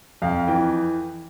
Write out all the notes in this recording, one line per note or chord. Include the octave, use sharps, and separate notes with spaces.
F2 F5
E3 G5